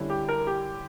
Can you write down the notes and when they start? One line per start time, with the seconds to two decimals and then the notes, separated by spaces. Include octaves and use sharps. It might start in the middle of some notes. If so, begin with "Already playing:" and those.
Already playing: D3 G3 C#4 E4
0.10 G4
0.29 A#4
0.47 G4